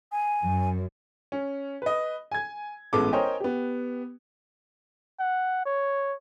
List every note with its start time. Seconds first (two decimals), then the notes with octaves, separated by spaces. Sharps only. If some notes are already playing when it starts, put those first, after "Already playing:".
0.12 G#5
0.44 F#2
1.32 C#4
1.82 B4 D#5
2.32 G#5 G#6
2.93 A1 G#3 B3 A4 D6
3.12 A#4 C5 C#5 D#5 G5 G#5
3.40 B3 G4
5.20 F#5
5.65 C#5